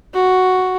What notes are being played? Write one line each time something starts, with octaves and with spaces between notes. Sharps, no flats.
F#4